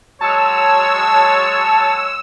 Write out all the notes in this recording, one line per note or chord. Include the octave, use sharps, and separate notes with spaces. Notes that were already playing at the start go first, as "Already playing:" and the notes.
F#3 G#3 C#5 A5 E6